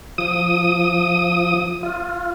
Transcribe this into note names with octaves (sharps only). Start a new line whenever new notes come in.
F3 D#6
F4